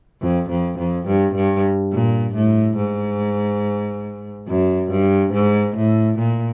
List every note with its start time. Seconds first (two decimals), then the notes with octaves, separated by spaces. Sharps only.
0.21 F2
0.50 F2
0.78 F2
1.07 G2
1.35 G2
1.92 A#2
2.34 A2
2.77 G#2
4.48 F#2
4.90 G2
5.33 G#2
5.76 A2
6.18 A#2